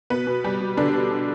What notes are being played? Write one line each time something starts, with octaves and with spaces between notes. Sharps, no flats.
B2 B3 B4
B2
B2 G3 G4
B2
B2 D3 D4
B2
B2